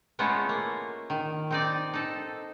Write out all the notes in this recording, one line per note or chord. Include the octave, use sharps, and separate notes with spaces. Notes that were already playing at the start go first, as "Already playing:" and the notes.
G#3 A3 B3 C#4 E4 F4
A#3
D#3
C4 D#4 D5
D#4 A4